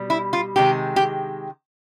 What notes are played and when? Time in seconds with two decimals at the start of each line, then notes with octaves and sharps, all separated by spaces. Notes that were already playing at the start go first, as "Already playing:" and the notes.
Already playing: B2 G3
0.10 E4
0.33 F4
0.56 C3 D#3 G#3 G4
0.96 G4